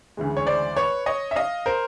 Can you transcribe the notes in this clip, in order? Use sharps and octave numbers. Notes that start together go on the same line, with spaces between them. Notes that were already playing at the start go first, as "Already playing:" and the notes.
D2 C#3 E3 G#3
C#5
C5 D5
B4 C#5
C#5 D#5
E5
D#5 F5
A#4 C5